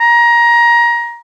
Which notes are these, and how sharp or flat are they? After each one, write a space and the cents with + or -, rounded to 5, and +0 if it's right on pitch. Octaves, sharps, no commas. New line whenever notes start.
A#5 +20